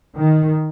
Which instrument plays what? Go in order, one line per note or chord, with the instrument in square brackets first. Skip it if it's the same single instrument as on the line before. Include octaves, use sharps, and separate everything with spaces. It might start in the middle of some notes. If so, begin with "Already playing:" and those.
[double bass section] D#3